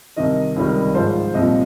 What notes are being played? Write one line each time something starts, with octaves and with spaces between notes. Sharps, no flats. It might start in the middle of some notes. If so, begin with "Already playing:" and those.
C2 C3 D#3 D#5
C#2 C3 D#3 G3
G#2 F3 C5
C2 A#2 F3 D#5